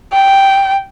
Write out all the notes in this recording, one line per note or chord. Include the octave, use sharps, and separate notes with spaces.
G5